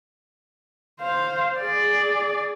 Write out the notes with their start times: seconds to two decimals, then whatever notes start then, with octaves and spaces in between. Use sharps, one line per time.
1.00 C5 F5
1.60 G#4 D5